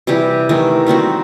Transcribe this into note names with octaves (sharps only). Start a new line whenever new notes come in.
C3 E3 G3 G4
D#3 E3 A3
G3 A#3 C4 F#4